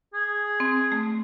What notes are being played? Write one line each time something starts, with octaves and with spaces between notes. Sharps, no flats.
G#4
C4
A3